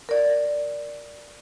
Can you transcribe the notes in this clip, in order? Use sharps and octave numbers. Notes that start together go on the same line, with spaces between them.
A#4 D5